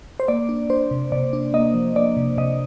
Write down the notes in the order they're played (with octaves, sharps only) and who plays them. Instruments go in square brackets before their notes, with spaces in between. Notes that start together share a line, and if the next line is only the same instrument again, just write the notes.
[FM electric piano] C5
A#3 D5
D4
D4 C5
C3
C3 D5
D4
A#3 D#5
F3
A#3 D5
C3
C3 D#5